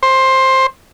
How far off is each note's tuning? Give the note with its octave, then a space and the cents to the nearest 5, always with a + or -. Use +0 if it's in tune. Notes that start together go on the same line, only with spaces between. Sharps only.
C5 +15